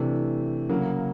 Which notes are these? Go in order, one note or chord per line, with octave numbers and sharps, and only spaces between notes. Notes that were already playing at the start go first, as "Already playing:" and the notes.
Already playing: C3 E3 A3 D4
C#3 F#3 A#3